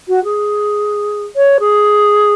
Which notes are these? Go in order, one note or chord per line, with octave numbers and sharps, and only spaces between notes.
F#4
G#4
C#5
G#4